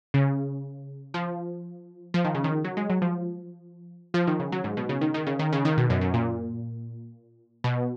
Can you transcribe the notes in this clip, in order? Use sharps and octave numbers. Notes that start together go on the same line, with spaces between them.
C#3
F3
F3
D#3
C#3
D#3
F#3
G#3
F#3
F3
F3
D#3
C#3
F#3
G#2
B2
C#3
D#3
D#3
C#3
D#3
C#3
D#3
B2
F#2
F#2
A#2
B2